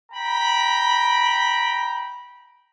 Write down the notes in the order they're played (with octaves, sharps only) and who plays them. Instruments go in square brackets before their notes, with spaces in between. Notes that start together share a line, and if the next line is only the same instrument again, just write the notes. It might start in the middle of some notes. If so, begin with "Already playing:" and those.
[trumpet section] G5 A#5 B5